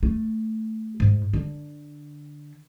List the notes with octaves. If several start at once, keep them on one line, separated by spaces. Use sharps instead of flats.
A3
G#2
D3